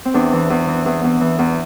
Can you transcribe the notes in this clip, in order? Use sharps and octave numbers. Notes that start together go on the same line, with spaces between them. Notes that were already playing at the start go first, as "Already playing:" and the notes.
C4
E2 D4
E3
E2
E3
E2
E2
E3
E2